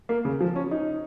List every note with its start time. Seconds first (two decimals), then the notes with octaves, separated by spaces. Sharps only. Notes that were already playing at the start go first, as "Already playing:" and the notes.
0.09 A#3
0.25 C#3
0.41 F3
0.56 C#4
0.71 D#4